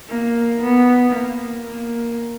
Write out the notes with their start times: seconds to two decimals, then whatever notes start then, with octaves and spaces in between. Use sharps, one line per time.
0.10 A#3
0.61 B3
1.14 A#3
1.67 A#3